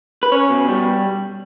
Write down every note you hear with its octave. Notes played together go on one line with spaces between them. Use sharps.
B4
C#4 C#5
B2
G3